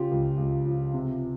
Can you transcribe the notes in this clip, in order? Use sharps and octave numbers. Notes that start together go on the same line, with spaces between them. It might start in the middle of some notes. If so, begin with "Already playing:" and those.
Already playing: C#3 F4 G4
C#2
C#2
F3
C3